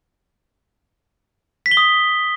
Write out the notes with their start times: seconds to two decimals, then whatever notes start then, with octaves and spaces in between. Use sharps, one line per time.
1.66 B6
1.71 G7
1.77 D#6